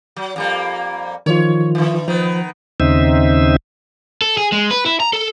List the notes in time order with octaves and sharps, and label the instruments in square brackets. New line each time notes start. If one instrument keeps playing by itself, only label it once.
[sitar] F#3
F2 G3 A#3
[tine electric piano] D#3 F3 F4 [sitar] C#5
[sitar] D3 E3
[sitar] D#3 B3 [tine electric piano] F3
[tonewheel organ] D#2 C#3 C4 D#4 E5
[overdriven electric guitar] A4
G#4
G#3
B4
E4
A#5
A4